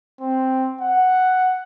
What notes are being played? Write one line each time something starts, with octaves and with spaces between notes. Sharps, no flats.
C4
F#5